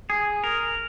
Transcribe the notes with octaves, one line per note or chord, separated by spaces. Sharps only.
G#4
A#4